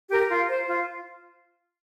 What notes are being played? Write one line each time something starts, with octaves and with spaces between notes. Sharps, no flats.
G4 A#4
F4
C5
F4